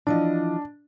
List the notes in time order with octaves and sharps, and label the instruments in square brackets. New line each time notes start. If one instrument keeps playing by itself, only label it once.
[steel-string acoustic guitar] E3 F3 D#5 [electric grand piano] D4